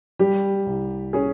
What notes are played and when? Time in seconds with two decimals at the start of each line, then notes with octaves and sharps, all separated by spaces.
0.19 G3 G4
0.66 C2
1.13 C#4 G#4